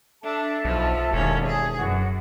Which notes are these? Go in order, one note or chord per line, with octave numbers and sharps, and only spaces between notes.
D4 A4 E5 A5
B1 F3
E1 D#2 C#4
G#4
F#2 F#4